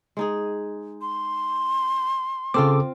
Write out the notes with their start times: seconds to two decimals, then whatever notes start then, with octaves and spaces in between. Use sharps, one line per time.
0.17 G#3 D#4 G#4
1.01 C6
2.54 C#3 C4 F4 A4 D6